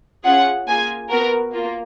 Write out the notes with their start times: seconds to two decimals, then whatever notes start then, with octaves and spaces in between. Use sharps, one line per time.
0.24 C#4 F4 G#4 F#5
0.67 A#3 F4 G#4 G#5
1.10 B3 F#4 A#4
1.52 A#3 F4